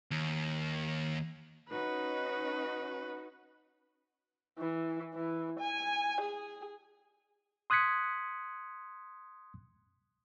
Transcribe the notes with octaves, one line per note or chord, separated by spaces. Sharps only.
D#2
C#4 D#4 F#4 B4
E3
E3
G#5
G#4
C6 D#6 F#6 G#6 B6 C#7